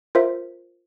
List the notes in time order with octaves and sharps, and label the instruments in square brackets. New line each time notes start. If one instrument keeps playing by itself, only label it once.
[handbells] F4 A#4 C5 E5